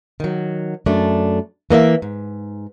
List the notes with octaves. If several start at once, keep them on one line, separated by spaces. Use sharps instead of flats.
D#3 F#3
F#2 A3 D4
E3 A#3 D#5 E5
G#2